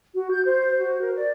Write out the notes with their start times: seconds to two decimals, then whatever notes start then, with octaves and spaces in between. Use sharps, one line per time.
0.14 F#4
0.32 G6
0.46 C5
0.79 F#4
1.01 A#4
1.16 D5